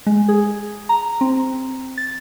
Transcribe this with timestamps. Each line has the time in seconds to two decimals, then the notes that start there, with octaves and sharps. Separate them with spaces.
0.07 G#3
0.29 G#4
0.89 A#5
1.21 C4
1.98 A6